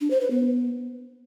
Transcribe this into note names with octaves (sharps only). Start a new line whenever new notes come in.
D4
C5
B4
B3